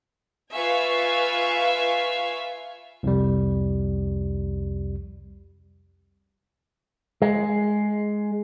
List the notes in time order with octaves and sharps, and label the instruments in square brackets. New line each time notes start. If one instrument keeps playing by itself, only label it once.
[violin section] F4 B4 E5 F5 G#5 C#6
[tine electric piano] C2 F2 G3
[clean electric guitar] G#3